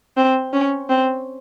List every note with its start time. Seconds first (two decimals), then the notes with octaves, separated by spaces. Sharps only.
0.17 C4
0.53 C#4
0.89 C4